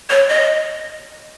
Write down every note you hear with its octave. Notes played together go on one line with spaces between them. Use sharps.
C#5
D#5